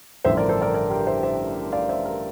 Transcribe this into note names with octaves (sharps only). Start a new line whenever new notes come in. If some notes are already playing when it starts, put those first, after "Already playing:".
A1 G2 D3 F3 C5 E5
A#4 D5
A4 C5
A#4 D5
A#4 D5
G4 A#4
C5 E5
C5 E5
D5 F5
C5 E5
G4 A#4